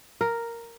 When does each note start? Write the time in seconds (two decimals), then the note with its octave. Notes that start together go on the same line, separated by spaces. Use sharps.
0.21 A#4